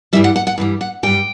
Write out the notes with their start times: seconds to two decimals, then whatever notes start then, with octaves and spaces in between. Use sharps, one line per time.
0.13 G2 E3 G3 E5
0.24 F#5
0.36 F#5
0.47 F#5
0.58 G2 E3 G3
0.81 F#5
1.03 G2 E3 G3 G5